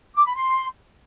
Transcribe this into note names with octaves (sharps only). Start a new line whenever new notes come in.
D6
B5
C6